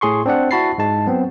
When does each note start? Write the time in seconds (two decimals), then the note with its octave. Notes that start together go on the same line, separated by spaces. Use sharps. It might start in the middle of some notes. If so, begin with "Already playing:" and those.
0.01 A2 G#4 C6 C#6
0.26 C4 D4 D5 F#5
0.51 E4 F#4 A5 B5 A6 C7
0.78 G#2 G#3 A5
1.06 F#3 B3 C4